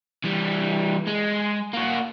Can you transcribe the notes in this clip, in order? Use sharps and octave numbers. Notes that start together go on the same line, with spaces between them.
E3 G3
G#3
A#3 F#4